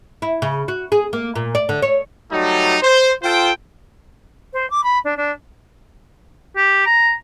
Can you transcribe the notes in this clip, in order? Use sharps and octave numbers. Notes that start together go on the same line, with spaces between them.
E4
C#3
F#4
G#4
A#3
A#2
D5
D3
C#5
F#3 G3 A3 D#4
C5
F4 A4 C5 G5
C5
D6
B5
D4
D4
G4
A#5